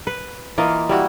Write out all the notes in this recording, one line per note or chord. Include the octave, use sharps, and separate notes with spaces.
B4
E3 A#3 F4 D#5
G3 E4 F#4